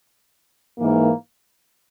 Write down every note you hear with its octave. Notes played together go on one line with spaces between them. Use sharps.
G#2 E3 A#3